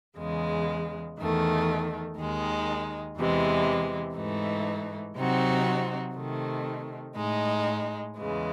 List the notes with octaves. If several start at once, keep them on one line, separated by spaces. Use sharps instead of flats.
E2 C#3 G#3
E2 D#3 A3
D#2 D#3 G#3 D#4
E2 C3 E3 G#3
G#2 E3 A3 D#4
C3 F#3 C4 D#4 F#4
C3 D#3 A3
A2 G#3 D#4
E2 C#3 E3 G#3